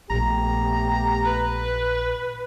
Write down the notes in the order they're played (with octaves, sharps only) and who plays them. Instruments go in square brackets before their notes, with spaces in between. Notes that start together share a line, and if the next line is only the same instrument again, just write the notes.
[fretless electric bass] A#1 [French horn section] A3 B3 G4 [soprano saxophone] A#5
[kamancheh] B4